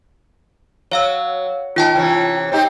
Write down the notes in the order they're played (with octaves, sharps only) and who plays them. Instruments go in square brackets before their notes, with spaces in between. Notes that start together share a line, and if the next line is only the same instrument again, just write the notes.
[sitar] F#3 [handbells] C#5 F5 E6
[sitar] D#3 [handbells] F4 G5 A5
[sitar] C3 E3 C#4
C4 D#4 G4